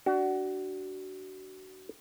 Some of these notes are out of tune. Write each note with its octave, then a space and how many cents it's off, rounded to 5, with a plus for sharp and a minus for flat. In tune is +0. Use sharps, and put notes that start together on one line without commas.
D4 +0 F#4 +25